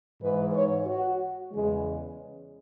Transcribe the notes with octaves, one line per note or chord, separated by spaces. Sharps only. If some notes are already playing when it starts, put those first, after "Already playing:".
G#2 E3 B4
C#5
F#4
E2 C#3 E3 G#3